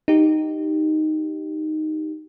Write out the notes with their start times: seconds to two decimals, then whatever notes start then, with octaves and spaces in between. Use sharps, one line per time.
0.08 D#4 G4